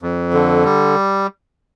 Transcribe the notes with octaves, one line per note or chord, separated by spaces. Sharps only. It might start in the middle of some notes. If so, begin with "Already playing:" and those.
F2
D3
G3